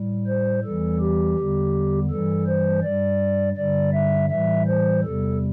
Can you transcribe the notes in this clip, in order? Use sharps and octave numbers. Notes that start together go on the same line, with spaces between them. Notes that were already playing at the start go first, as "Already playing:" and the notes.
Already playing: A2 G3
C5
E2 E3 G3 A4
G4
E2 D3 G3
G2 E3 G3 A4
C5
G2 G3 D5
G2 D3 G3 D5
E5
A2 E3 G3 E5
C5
E2 C3 G3 A4